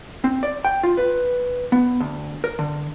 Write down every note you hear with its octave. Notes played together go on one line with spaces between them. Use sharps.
C4
D5
G5
F4
B4
B3
D2
A#4
D3